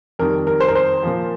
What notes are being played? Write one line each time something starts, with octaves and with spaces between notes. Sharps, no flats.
F2 D#3 G3 A#4
A#4
C5
A#4
C5
A#2 F3